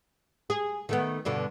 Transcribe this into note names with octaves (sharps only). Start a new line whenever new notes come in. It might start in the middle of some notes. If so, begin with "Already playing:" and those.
G#4
D#3 A3 B3
G2 B2 D3